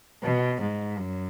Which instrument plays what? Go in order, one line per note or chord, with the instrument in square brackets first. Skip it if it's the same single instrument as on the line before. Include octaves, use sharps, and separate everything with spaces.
[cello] B2
G#2
F#2